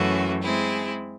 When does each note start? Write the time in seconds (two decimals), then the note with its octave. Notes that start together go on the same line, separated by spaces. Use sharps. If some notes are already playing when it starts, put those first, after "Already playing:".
Already playing: F#2 E3 A3 C#4 F#4
0.42 G#3 C4 E4 G#4